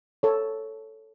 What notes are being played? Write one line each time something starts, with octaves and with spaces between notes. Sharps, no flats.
A4 C#5